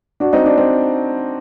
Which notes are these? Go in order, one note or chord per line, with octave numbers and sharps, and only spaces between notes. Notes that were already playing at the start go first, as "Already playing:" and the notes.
D4 F#4
C4 D#4
D4
C4